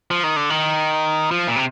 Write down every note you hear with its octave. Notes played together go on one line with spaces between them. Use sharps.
F3
D#3
D3
D#3
F3
A#2
C3